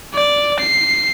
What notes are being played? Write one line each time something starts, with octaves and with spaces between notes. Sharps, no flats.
D5
C7